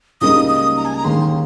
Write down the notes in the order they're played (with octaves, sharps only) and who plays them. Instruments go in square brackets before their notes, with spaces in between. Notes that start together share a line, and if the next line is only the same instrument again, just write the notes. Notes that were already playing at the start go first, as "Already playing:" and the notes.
[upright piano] C#2 C#3 G3 A#3 D#4 [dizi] D#6
[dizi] D#6
A#5
G#5
A#5
[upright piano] D#2 D#3 G#3 [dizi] C6